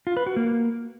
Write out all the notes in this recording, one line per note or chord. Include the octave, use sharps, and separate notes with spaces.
F4
B4
F#4
A#3